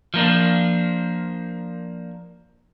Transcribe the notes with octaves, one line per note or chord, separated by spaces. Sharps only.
F3 A#3 D4